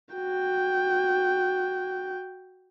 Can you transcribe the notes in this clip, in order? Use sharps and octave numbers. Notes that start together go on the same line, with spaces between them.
F#4 G5